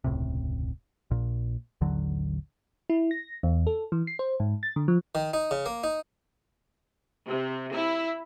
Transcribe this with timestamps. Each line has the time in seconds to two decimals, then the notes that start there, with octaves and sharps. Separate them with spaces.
0.04 E1 C#2 A2 C3
1.11 A#1 A#2
1.81 A1 D#2 D3 F#3
2.90 E4
3.11 A#6
3.43 E2
3.67 A4
3.92 E3
4.07 C7
4.19 C5
4.40 G#2
4.63 A6
4.76 D3
4.88 F3
5.15 D#3
5.34 D#4
5.51 C#3
5.66 A#3
5.84 D#4
7.27 C3
7.72 E4